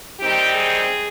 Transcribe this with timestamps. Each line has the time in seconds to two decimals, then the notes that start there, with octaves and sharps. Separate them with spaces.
0.20 D#3 G3 C4 D#4 G4
0.54 G#4